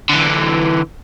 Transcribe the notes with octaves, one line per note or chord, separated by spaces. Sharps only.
D3 E3